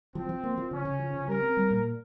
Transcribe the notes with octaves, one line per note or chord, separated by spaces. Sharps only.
F3 C4
F3
A#3
F3
C#3 C#4
C#3
F3
C#3
G3 A#4
C4
G3
A#2